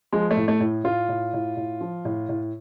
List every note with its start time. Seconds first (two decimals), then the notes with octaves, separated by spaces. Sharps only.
0.12 F3 G#3
0.31 A3
0.37 A2
0.48 A3
0.60 A2
0.84 A2 F4
1.09 A2
1.34 A2
1.57 A2
1.81 F3
2.05 A2
2.29 A2